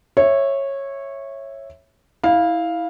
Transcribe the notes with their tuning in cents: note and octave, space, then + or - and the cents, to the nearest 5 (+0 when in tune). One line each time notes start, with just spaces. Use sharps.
C#5 -15 E5 +0
E4 -20 F5 +0